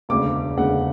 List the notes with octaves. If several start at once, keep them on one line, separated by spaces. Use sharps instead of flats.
E1 D2 C#3 D6
E1 D2 C#3 F#5